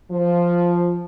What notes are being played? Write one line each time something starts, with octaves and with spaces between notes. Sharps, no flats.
F3